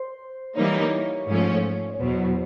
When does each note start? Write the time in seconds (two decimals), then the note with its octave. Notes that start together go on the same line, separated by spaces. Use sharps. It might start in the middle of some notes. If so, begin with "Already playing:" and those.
Already playing: C5
0.56 E3 G3 A#3 D#4 C#5
1.28 G#2 F3 A3 C#4
1.94 C#5
2.00 E2 B2 F#3 C5